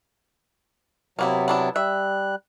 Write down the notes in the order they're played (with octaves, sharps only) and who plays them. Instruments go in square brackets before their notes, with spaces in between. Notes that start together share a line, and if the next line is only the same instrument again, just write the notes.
[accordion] C3 F#3 [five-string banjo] A#3 B3 E4
[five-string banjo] B3 D4 E4
[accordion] G3 F#6 [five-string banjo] E5